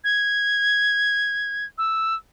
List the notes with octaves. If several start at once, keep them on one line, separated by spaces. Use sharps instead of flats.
G#6
E6